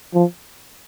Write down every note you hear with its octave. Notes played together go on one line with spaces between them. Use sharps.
F3